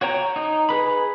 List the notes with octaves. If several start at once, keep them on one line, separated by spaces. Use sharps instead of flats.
F#4 C#5 G5 A#5
D#4
G#4 B4 B5